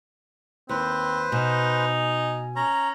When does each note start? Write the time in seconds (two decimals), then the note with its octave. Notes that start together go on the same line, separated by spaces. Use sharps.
0.69 D#2 C4 B4 C5
1.32 B2 D#4 G#5
2.56 C#4 A#5